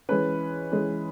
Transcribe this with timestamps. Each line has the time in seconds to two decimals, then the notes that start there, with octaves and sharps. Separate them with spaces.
0.09 E3 G#3 C#4 B4
0.71 E3 G#3 C#4